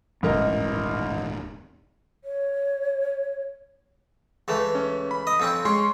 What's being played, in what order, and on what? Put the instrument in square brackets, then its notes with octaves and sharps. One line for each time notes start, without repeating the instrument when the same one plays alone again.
[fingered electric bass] D#1 G#2 [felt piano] A1 A#4 D#5
[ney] C#5
[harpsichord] C#2 E3 A3
[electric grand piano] C#4
B5
[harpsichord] D#5
F2 C4 C#4
[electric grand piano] G#3 C6 C#6 [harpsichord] C#4